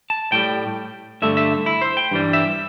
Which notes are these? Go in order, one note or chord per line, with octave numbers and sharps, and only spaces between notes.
A5
A2 G3 G5
G2 D3 A3 E5
E5
E4
C5
G5
G2 E3 G3
E5